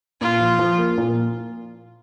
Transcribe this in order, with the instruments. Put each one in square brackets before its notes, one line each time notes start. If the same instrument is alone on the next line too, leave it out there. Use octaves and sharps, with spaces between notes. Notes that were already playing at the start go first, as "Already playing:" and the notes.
[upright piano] A#2 [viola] F4
[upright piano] F3
F3
A#3
A#2